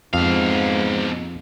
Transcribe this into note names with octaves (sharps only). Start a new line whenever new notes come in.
F2 G#2 B2 F5